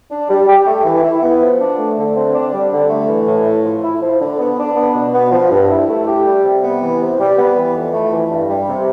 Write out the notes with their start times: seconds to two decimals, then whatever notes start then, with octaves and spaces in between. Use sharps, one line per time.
0.10 D4
0.29 G3
0.47 G4
0.66 A3
0.85 E3
1.03 E4
1.22 B3
1.40 F3
1.60 D4
1.78 A3
1.96 D3
2.15 C4
2.34 D4
2.52 G3
2.72 D3
2.90 A3
3.08 E3
3.27 A2
3.46 A3
3.64 F3
3.83 E4
4.01 F3
4.20 D3
4.39 B3
4.58 D4
4.76 B3
4.94 B2
5.14 B3
5.32 F3
5.51 G2
5.70 E4
5.88 A3
6.06 G4
6.25 G3
6.43 C3
6.63 B3
6.82 E3
7.00 C3
7.19 G3
7.38 B3
7.56 E3
7.74 F2
7.93 A3
8.12 E3
8.30 G2
8.48 G3
8.68 C3